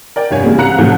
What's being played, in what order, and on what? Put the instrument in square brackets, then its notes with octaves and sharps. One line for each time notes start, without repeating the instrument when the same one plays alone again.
[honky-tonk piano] A#4 D5 G5
F1 G2 C#5 G#5
C#3 E3 G3 G#3 A#3
C2 C3 F5 A#5 F#6 C#7
C2 A2 C3 D#3 F3 A3